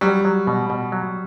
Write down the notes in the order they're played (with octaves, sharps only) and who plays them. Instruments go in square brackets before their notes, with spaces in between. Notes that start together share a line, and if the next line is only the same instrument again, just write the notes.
[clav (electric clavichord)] F#3 [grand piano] G3
[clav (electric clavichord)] F#3
B2
B2
F#3